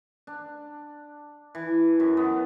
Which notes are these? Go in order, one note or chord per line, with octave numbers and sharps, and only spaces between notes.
D4
E3
F#2
B3